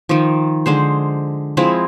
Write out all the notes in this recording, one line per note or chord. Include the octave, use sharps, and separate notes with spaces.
D#3 F3
D3 G#3 C5
F3 G#3 C4 E4